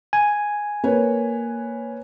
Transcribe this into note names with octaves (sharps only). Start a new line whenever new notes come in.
G#5
A#3 B4 C#5